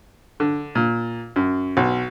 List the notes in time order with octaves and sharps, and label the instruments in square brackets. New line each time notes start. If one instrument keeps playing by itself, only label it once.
[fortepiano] D3
A#2
F#2
B1